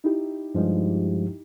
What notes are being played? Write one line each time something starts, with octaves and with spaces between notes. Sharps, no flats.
D#4 E4 G4
G2 F3 G#3